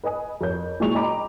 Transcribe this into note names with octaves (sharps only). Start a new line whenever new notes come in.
B4 D#5 G#5 D#6
F2 A#4 C#5 G6
A#2 F#3 G#3 E4 C#6 F7
D#5 G5 A#5 B5 D6